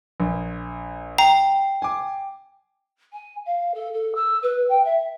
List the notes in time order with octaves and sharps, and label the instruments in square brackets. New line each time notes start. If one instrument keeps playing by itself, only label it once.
[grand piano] A#1
[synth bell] G5 [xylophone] A#5
[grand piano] G#5 D6
[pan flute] G#5
F5
A4
A4
E6
B4
G5
E5